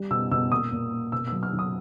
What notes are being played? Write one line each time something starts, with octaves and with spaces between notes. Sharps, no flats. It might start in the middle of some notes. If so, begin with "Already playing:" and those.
Already playing: G3
B2 E6
B2 E6
A#2 D#6
A#2
A#3
B2 E6
E6
F#3
F6
F#3
D#6